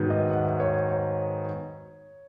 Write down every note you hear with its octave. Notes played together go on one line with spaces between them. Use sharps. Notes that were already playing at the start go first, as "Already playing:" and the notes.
Already playing: G#2 D#3 F#3 B3
D#5
F#5
E5
C#5
C#5